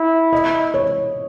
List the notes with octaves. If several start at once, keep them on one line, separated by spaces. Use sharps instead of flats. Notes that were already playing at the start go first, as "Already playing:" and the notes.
Already playing: E4
D#5
C#5